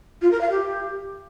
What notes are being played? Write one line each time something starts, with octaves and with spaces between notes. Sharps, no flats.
F4
A#4
F5
G4